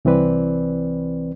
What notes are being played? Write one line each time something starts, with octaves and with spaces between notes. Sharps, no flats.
C2 E3 C4 B4 D5